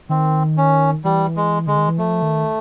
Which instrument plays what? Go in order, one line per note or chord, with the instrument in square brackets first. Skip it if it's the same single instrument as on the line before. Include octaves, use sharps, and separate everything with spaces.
[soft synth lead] D#3 [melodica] C4
[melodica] C#4
[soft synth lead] E3 [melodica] G3
[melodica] G#3
[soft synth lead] D3 [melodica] G#3
[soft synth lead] D#3
E3
[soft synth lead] F3 [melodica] A3
[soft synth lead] D#3